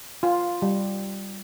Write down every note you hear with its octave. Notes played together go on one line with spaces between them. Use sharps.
F4
G3